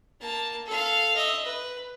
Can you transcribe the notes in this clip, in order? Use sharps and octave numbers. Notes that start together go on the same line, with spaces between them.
A#3 A5
A4 F5
D#5 E5
B4